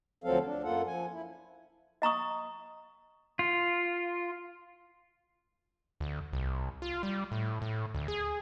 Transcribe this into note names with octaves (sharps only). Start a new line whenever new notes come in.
D2 F3 F#3 C4 A4 F5
D4
F#2 A#3 F4 A4 F#5
F3 G#5
E4
D#5 A#5 C#6 D#6
F4
D2
C2
F4
G3
A2
A2
D2
G#4